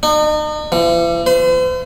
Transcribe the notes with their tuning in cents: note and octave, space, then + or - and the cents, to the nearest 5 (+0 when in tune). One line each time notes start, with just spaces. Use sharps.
D#4 -40
E3 +45
C5 -45